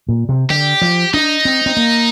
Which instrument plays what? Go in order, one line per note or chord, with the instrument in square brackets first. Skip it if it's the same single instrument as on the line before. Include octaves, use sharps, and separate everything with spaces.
[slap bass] A#2
C3
[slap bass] D3 [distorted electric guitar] G4
[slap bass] F3
[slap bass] D4 [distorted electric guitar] D#4
[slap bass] C4
C4
A#3